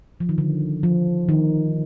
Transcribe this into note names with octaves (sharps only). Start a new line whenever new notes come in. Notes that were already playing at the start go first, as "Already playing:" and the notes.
F3
D#3
D3
F3
D#3